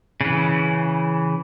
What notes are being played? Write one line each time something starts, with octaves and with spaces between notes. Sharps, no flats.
C#3 E3